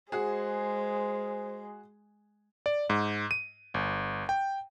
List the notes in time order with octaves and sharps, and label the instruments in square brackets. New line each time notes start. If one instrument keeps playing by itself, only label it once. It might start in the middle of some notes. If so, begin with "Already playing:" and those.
[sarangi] G#3 [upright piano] F#4 G#4 [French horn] C5
[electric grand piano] D5
G#2
D#7
G1
G5